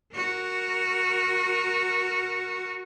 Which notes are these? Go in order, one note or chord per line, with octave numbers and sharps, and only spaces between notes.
F#4 A#4